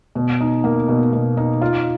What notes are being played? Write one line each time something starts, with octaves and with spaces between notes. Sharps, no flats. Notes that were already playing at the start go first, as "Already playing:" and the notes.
B2
D#4
A#3
B2
B2
D#4
F4